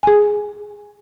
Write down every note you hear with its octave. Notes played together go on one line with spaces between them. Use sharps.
G#4 G#5